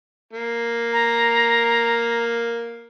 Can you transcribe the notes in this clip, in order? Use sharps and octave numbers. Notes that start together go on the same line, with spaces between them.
A#3
A#5